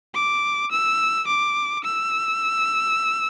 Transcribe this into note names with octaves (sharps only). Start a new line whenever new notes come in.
D6
E6
D6
E6